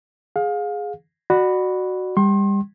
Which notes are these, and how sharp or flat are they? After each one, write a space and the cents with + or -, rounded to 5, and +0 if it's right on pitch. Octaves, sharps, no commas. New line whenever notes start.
G#4 +0 F5 +30
F#4 +0 D5 +35 B5 +0
G3 +30 G5 -35 C6 +35